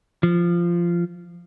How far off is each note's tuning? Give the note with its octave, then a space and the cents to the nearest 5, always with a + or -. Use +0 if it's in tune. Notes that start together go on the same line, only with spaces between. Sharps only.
F3 -15